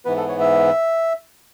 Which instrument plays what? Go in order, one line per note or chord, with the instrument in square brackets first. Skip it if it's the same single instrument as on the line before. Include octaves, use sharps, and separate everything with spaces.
[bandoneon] G#2 E3 B3 B4
A4
C#5
E5